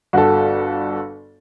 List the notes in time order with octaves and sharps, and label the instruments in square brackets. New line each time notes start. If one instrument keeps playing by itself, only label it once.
[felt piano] G1 [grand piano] F#4 A4